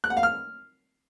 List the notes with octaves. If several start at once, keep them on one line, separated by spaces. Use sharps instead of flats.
F#6
F#5
F5
F6